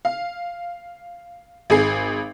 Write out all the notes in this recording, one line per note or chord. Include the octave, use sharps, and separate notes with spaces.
F5
G#1 G#4 C7